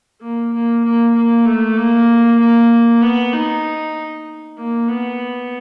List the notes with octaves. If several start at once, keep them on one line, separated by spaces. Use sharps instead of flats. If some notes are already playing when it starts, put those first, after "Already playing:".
A#3
A#3
A#3
A#3
A3
A#3
A#3
B3
D#4
A#3
B3